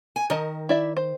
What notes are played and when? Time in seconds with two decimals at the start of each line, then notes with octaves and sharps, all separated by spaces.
0.16 G#5
0.30 D#3 A#4 D#5 A5
0.69 E4 D5 E5
0.97 C5